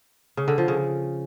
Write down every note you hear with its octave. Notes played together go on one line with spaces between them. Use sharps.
C#3
D3
F3
C#3